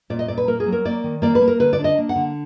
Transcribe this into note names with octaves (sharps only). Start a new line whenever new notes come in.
A#2 D5
D#5
A#2 D5
B4
A#3 A#4
G#4
F#3
A#4
A#3 D5
D#3
A#3 D5
B4
A#3
A#4
D3 B4
D5
D4
D#5
A#3
F#5
D3